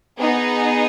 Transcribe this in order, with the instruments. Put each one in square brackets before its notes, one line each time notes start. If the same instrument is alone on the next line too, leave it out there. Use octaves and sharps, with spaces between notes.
[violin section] B3 D#4 G#4